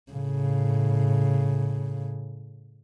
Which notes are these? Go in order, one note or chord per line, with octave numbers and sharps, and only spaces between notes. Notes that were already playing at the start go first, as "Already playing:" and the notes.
A2 C#3